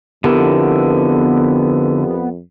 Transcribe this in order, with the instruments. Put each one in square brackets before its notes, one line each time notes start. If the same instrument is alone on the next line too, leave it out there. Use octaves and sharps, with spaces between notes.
[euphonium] F2 [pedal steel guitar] D3 E4 [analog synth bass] B3 [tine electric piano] G4 A#4